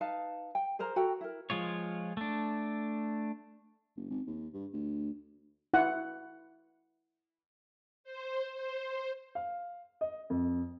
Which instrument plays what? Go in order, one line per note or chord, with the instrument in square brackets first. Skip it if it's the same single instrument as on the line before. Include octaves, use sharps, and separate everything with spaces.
[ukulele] D#4 B4 F5 A5
G5
G#4 A#4 C5 A#5
F#4 A4 G5 A#5
E4 A#4
[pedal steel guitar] F3 G#3 F4 C#5
A3 D4
[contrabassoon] F#1
G#1
D#2
G2
D2
[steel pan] E4 F#5
[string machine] C5
C5
[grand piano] F5
D#5
F2